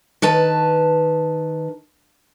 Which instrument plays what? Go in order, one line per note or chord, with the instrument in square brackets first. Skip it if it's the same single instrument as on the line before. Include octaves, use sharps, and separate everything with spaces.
[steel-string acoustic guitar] D#3 B4 A5